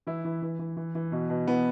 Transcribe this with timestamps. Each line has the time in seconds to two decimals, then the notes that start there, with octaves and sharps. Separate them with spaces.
0.07 E3 E4
0.25 E3
0.42 E3
0.59 E3
0.77 E3
0.95 E3
1.12 B2
1.30 B2
1.47 E3 B3